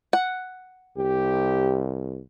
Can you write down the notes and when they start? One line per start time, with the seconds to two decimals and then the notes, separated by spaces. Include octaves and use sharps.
0.13 F#5
0.97 C2 G4